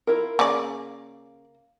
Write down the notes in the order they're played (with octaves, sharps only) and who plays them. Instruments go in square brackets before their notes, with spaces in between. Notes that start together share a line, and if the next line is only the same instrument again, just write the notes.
[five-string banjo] E4 F4 A#4
[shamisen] C#3 D5 [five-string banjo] A#3